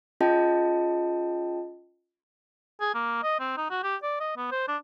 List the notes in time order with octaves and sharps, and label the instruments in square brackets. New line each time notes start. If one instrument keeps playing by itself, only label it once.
[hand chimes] C#4 F4 G#4 D#5 G5 A5
[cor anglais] G#4
A#3
D#5
C4
D#4
F#4
G4
D5
D#5
B3
C5
D4